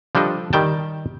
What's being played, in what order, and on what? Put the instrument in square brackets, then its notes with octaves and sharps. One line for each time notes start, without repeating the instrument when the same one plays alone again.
[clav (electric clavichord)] F3 G3 D4 A4 D#5
D#3 G3 G5 A5